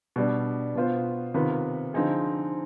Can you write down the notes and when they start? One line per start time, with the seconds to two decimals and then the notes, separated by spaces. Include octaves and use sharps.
0.16 B2 G3 D4
0.75 B2 B3 F4 C5
1.34 C3 D#3 B3 F4 B4
1.94 D3 F3 C4 D#4 G#4